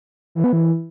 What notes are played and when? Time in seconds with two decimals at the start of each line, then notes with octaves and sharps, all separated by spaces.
0.35 E3
0.44 B3
0.53 E3